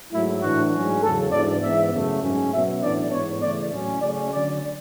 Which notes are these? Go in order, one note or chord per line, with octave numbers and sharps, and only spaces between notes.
G#2 F#3 A3 E4
A2 E3 A3 D4 F#4
G#2 F#3 C#4
E2 C#3 F#3 C#4 A4
G#2 E3 B3 D4 D5
G#2 E3 B3 E5
F#2 C#3 F#3 A3
G#2 F#3 C#4
B2 F#3 B3 E5
A2 E3 B3 D4 D5
G#2 E3 B3 C#5
C#3 E3 A3 D5
A2 F#3 C#4
C#3 F#3 A3 C#4 D5
D3 F#3 C#4 D5